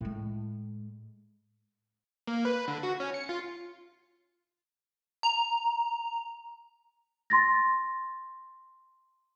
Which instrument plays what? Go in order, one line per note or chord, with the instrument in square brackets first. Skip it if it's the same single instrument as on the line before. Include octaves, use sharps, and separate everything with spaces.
[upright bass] A2 G#3
[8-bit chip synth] A#3
B4
D3
F#4
C#4
C#7
F4
[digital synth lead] A#5
[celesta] C6 A6 A#6